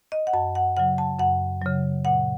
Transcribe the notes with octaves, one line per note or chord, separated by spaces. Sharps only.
D#5
F#5
F#2 A5
F#5
C#3 F#3 F#5
A5
F#2 F#5
C#3 F#3
A#2 F#5